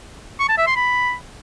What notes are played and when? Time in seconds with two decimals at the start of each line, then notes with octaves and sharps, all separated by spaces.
0.40 C#6
0.49 A5
0.58 E5
0.67 C6
0.76 B5